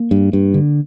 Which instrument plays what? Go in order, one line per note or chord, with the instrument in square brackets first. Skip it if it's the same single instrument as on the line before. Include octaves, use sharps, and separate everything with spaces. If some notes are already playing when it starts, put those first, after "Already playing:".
Already playing: [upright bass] A#3
[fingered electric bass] G2
G2
D3